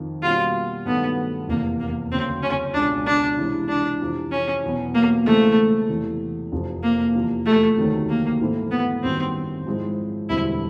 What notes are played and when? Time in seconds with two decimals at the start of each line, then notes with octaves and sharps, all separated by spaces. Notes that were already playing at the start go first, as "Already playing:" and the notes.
Already playing: F2 D#3
0.23 B2 G3 A#3 C#4 F4 F#4
0.86 G2 D#3 F#3 A3 B3
1.48 F1 E2 C3 A#3
1.80 A#3
2.11 D2 C#3 F#3 C4
2.43 C#4
2.74 C#2 B2 G#3 D4
3.06 D4
3.38 C3 E3 G#3 C#4 E4
3.69 D4
4.01 F2 C3 E3
4.31 C#4
4.64 E2 B2 F#3 B3
4.95 A#3
5.26 C#3 E3 G#3 A3 C4
5.89 E2 C3 E3
6.52 F1 F2 C3 F3
6.83 A#3
7.15 E2 C3 F3
7.46 A3
7.77 D2 C3 D#3 F#3
8.09 A#3
8.40 G#2 E3 A3 C4 E4
8.71 B3
9.03 G#1 F#2 D#3 G3 C4
9.66 G#2 F3 G#3 C4 E4
10.29 E1 D2 D3 G3 C4 E4